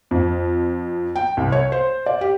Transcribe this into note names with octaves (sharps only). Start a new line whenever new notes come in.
F2
G5
C2
C#5
C5
D5
G4